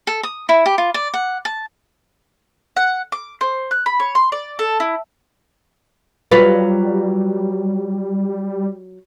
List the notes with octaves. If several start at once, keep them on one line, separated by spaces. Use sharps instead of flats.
A4
D#6
E4
G4
F4
D5
F#5
A5
F#5
D6
C5
F#6
B5
C#5
C6
D5
A4
E4
F#3 G3 F4 B4